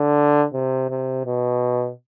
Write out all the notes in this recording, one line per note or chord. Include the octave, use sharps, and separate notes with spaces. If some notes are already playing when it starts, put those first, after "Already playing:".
Already playing: D3
C3
C3
B2